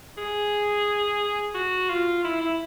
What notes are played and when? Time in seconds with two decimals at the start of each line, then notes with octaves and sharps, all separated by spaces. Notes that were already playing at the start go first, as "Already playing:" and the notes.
0.18 G#4
1.54 F#4
1.89 F4
2.24 E4
2.41 E4